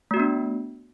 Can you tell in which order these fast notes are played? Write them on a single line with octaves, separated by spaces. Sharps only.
A3 F#4 B3 D4